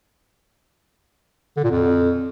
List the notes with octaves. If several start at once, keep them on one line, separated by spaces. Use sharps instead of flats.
D3
A#2
F2